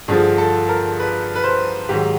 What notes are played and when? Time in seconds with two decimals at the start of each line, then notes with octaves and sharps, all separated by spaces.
0.08 G2 D3 F3 G#4
0.38 A4
0.69 A#4
1.00 B4
1.36 B4
1.44 C5
1.89 G#2 D#3 F#3 G4